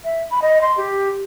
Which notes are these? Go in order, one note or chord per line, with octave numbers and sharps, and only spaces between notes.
E5
B5
D#5
C6
G4